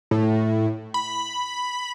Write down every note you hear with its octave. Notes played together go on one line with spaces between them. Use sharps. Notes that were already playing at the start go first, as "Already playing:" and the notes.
A2
B5